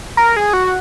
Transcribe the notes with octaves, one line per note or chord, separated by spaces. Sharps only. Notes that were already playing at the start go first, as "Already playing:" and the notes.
A#4
G#4
F#4